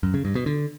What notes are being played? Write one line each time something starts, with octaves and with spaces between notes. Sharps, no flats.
F#2
C#3
G2
B2
D3